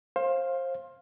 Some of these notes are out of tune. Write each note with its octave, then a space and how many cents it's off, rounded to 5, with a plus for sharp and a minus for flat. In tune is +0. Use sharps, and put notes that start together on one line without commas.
C5 +25 F5 +0